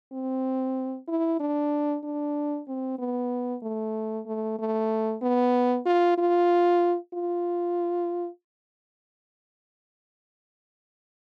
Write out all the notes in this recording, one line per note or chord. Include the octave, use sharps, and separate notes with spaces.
C4
E4
D4
D4
C4
B3
A3
A3
A3
B3
F4
F4
F4